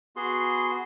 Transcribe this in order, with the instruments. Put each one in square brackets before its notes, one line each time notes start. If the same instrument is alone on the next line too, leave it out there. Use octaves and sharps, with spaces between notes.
[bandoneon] B3 F#4 G#4 C6